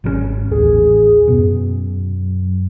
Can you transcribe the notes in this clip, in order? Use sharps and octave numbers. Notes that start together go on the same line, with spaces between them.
G#1 D#3 C#4
A1 D#2 G#4
F#2 B2